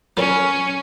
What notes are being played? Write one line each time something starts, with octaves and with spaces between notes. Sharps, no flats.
F#3 G3 C#4 A#4